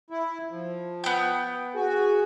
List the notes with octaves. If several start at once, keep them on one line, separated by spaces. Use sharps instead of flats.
E4
F3
B3 G5
F#4 G#4